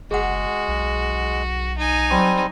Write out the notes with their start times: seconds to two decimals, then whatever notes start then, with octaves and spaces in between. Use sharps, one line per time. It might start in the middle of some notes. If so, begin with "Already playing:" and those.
0.11 F#1 G#3 F#4 G#4 F#5
0.68 B1
1.78 D#4 G#5
2.10 F#3 G3 C4 C#6